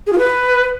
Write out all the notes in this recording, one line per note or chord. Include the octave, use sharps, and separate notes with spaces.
G#4
F4
B4